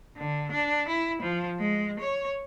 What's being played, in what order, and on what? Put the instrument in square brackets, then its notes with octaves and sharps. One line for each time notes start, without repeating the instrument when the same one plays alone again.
[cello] D3
D4
E4
F3
G#3
C#5